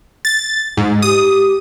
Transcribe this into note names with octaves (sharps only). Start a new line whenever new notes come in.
A6
G#2
G4 D#6